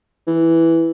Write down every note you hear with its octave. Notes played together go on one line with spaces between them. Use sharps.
E3